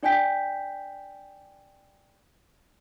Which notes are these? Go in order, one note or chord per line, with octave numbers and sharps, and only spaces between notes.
D4 D5 G5 G#5 G6 B6